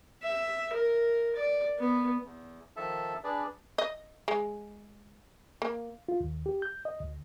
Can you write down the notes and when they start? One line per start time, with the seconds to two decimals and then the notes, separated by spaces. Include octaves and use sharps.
0.23 E5
0.73 A#4
1.36 D5
1.79 B3
2.25 E2
2.76 D#3 F3 A4 E5 A5
3.24 D4 G#4 B4 D5
3.78 D#5
4.28 G#3
5.62 A#3
6.09 F4
6.20 D#2
6.46 G4
6.62 G6
6.85 D#5
7.00 D2